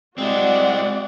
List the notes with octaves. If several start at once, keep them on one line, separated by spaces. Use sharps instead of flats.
G#3 C4 E4 F#4 D5 F#5